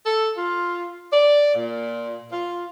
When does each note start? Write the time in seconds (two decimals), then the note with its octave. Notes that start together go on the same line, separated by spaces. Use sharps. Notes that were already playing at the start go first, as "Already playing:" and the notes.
0.05 A4
0.37 F4
1.12 D5
1.55 A#2
2.31 F4